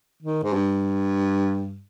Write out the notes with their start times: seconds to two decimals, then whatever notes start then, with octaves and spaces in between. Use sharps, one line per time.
0.23 D#3
0.43 G#2
0.53 G2